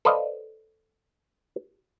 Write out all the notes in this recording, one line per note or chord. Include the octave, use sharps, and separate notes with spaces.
A4 B4 C5 D5 D#5 F5